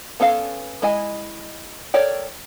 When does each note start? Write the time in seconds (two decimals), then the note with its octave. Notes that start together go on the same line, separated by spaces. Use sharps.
0.20 B3 C#4 A4 F5
0.82 G#3 E4 D#5 G#5
1.94 A4 A#4 C#5 D5 G5